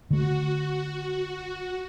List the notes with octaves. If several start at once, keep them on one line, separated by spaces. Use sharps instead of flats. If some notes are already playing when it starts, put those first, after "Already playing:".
D3 A3 F#4